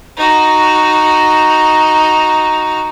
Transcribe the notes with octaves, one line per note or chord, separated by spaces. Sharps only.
D#4 F#4